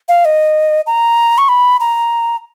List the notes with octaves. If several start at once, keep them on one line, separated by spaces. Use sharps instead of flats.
F5
D#5
A#5
C#6
B5
A#5